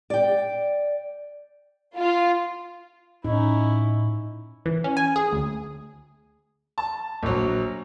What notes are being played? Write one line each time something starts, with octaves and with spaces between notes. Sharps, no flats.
D5 G5
F4
A2 C#4 D#4 E4
E3
C#4
G#5
G#4
D2
A5
A#1 F#3